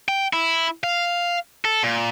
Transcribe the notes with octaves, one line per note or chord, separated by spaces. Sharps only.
G5
E4
F5
A4
A#2